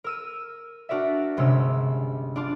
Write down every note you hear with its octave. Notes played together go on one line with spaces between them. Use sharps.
A#4 E6 D#7
D4 F#4 A#4 D5 E5
G1 C3 G#3 C#4 E6
D4 F4 D6